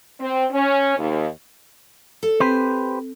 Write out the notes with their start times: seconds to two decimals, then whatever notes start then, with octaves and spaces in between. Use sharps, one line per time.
0.19 C4
0.51 C#4
0.97 D#2
2.23 A4
2.40 C4 G4 B4 C5 G#5